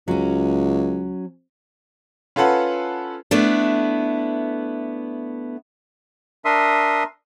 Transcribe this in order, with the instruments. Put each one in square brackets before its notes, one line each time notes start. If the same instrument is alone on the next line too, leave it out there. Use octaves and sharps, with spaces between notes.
[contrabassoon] C#2 [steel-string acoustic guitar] F#3 C#4
[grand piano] C#4 F4 A4 B4 F#5
[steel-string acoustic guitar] A3 B3 D4 E4
[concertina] D4 A#4 E5 C6 D#6